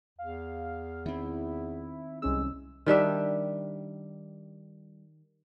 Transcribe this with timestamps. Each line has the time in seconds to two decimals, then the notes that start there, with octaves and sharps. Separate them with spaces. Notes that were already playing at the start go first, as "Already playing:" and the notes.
0.19 E2 F5
1.06 D#3 C4 E4
2.22 C2 G#3 C#4 E6
2.86 D#3 G3 D4 E5